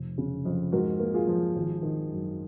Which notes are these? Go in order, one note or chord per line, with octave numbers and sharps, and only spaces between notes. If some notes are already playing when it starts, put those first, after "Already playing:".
Already playing: F1
C#3
F2
G#2 F#4 A#4
A#3
F4 G#4
F3
G#1
D#3
F#2